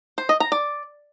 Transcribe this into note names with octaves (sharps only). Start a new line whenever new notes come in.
C5
D#5
A#5
D5